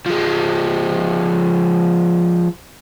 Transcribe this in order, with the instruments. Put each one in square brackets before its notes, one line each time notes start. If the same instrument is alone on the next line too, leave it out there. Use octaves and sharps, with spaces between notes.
[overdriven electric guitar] F3 G#3